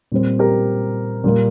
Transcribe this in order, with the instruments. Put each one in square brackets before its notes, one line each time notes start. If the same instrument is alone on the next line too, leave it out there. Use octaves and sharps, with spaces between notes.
[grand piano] A#2 G3 C4
G4 A#4
A#2 G3 A#3